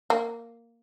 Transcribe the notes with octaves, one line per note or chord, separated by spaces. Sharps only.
A#3